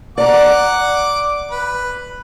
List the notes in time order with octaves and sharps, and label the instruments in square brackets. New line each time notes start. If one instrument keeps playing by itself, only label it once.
[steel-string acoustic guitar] D5 A#5 [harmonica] F#5 D6
[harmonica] B4